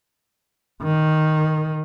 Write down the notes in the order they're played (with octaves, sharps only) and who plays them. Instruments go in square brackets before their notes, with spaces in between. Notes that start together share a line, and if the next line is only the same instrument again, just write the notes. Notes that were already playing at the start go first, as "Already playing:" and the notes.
[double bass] D#3